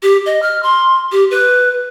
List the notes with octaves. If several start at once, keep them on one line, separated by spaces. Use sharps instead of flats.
G4
D#5
F6
C6
G4
B4